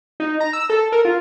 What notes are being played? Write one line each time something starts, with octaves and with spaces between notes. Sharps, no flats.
D#4
A#5
E6
A4
A#4
F4